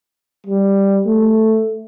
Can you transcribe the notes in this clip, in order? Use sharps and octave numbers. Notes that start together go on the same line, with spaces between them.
G3
A3